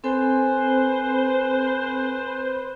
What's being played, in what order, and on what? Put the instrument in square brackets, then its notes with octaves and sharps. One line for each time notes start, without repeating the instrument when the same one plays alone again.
[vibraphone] C4 A4 G#5 [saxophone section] B4 C5